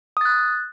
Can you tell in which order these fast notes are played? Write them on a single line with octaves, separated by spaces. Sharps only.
D#6 A6 F#6